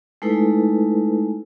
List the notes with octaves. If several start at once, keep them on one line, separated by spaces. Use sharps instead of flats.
G#3 A3 D#4 E4 A4 B4